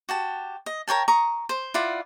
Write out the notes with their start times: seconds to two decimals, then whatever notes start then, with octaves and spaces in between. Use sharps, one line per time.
0.09 F#4 G4 A5
0.66 D#5
0.88 A#4 C#5 G5 A5
1.08 A#5 C#6 D#6
1.49 C5
1.74 E4 F4 D5 F#5